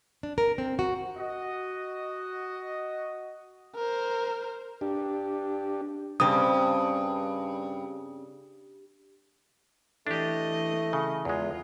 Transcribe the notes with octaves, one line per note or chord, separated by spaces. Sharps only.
D4
A#4
C4
F#4
F#4 D#5
A#4 C5
D4 G4
G2 C#3 C4 D#6
E3 A3 D4 G4 D#5
C#3
E2 G#3 F4